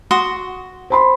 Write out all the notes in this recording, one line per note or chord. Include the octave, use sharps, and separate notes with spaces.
F#4 C6 D#6
C5 B5 C6